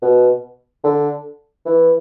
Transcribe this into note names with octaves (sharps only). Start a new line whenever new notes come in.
B2
D3
E3